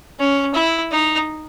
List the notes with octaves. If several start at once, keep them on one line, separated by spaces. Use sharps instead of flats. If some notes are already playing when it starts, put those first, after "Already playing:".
C#4
E4
D#4